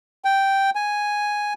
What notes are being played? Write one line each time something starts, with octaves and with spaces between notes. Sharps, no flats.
G5
G#5